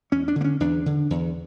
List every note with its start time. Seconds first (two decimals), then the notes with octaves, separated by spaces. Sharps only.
0.12 E2 C#4
0.28 D4
0.36 D3
0.41 A#3
0.44 C#4
0.60 E2 D4
0.86 D3
1.10 E2